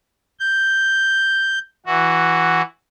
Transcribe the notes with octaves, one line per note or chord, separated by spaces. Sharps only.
G6
E3 F#4